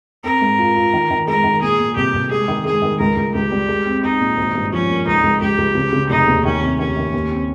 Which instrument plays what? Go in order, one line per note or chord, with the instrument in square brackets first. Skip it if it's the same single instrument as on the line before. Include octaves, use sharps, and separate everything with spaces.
[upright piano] C4 [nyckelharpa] A#4
[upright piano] G#2
F4
F4
D#3
D#3
[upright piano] G#3 [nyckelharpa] A#4
[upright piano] D#3
[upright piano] A#2 [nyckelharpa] G#4
[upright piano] A#2
[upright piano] C2 [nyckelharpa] G4
[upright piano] C2
[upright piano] G#3 [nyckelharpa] G#4
[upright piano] D#3
[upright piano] G#3 [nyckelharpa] G#4
[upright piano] D#3
[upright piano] C#2 [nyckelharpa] A#4
[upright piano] C#2
[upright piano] C#2 [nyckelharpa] G4
[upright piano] G3
G#3
C4
[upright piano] C4 [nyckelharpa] D#4
[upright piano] A#2
G#1
G2
[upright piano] F3 [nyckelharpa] C#4
[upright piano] A#3
[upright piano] C#2 [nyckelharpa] D#4
[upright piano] C#2
[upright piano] C#2 [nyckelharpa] G4
[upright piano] C#2
C#3
C#3
[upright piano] F1 [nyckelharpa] D#4
[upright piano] D#2
[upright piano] D#3 [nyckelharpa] C#4
[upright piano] C3
[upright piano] D#3 [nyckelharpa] C#4
[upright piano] D#3
D#2
C4